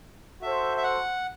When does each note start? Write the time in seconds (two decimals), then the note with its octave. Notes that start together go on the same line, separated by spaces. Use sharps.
0.42 F#4 A4 C5 E5
0.77 E5
0.83 F#5